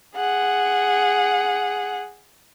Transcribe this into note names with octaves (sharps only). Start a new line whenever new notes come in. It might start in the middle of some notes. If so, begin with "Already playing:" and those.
G#4 F#5